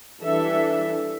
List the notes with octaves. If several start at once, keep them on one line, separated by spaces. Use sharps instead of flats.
E3 G3 D4 A4 E5